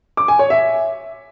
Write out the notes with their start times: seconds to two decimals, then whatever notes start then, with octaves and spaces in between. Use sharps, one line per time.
0.17 D6
0.28 G#5
0.39 C#5
0.50 E5